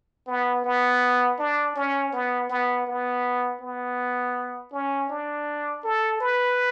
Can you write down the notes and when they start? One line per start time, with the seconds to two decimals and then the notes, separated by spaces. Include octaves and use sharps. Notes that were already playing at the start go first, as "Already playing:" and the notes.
0.27 B3
0.64 B3
1.39 D4
1.76 C#4
2.13 B3
2.49 B3
2.87 B3
3.61 B3
4.72 C#4
5.10 D4
5.84 A4
6.20 B4